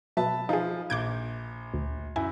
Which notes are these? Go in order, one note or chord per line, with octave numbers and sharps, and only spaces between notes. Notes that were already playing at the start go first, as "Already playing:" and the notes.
B2 F#3 B4 E5 A5
F3 D#4 G#4
A#1 D6 G6 G#6 D7
D2
F#2 E4 G#5